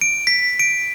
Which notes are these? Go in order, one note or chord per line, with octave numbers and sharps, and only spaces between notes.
D7
B6
D7